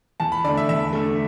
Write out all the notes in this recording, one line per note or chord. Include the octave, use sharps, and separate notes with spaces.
E2 A5
B5
D3 A3 D5
E5
E2 E5
D3 A3